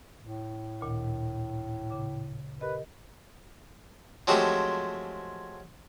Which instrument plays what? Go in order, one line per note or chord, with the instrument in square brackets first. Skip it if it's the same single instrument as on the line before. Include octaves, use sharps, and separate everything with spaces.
[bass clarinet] A2
[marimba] D2 A#2 D#3
C#3 D6
[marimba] G4 A#4 D#5 [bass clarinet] B4
[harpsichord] F3 F#3 G#3 A3 C4 G4